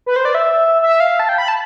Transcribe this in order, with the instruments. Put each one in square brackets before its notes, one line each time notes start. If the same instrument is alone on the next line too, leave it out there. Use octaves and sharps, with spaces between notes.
[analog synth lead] B4
C5
D5
E5
E5
F5
A5
G5
B5
A5